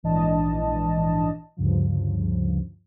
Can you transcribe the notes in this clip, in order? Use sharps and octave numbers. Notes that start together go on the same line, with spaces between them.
A#1 G#2 E3 D4 D#5 A5
D2 G2 C#3 F3